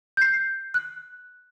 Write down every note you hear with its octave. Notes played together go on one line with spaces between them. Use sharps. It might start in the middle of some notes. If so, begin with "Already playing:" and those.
G6 C7
F#6